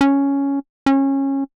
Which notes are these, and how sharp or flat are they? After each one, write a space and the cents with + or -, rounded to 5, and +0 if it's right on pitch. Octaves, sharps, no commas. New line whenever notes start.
C#4 +5
C#4 -20